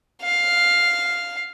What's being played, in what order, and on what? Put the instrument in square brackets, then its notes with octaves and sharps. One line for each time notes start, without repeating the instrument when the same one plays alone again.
[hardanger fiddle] F5